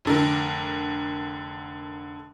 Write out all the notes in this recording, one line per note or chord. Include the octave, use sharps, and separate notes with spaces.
F1 D3 A#4